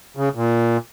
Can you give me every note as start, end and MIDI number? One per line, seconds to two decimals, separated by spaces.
0.17 0.29 49
0.35 0.77 46